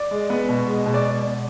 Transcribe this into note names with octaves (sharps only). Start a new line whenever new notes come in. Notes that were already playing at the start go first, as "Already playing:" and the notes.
Already playing: D5
G#3
B3
B2
G#3
B2
D5